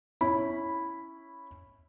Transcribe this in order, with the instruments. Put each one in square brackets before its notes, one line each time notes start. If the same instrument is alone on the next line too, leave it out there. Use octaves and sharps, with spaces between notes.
[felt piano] C#4 E4 B5